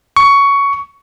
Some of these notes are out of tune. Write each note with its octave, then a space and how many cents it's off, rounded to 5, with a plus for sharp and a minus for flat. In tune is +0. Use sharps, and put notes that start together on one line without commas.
C#6 +15